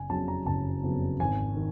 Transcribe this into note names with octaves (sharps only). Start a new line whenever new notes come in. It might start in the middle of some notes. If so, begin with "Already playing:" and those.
Already playing: F#1 G#5
F2 C#3 F#3 B3 A5
A#5
F#1 A5
F2 C#3 F#3 B3
G#1 G#5
D#3